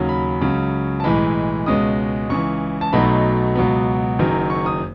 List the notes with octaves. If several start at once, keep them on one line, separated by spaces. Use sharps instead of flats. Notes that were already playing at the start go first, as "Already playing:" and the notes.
Already playing: D#2 C#3 F#3 C#4
B5
C#2 C#3 F#3 C#4
A5
B1 A2 E3 G#3 B5
C#2 B2 G#3 C#4 D#6
C#2 C#3 E3 C#6
A5
B1 B2 F#3 A3 D#4 B5
C#2 B2 F#3 B3
F#1 F#2 D#3 F#3
C#6
D#6